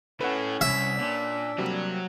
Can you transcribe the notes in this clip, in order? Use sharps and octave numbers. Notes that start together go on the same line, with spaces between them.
A3 C#4 E4 B4 F#5
C2 E5
A#2 D4
C3 F#3 G3 A#3 F#4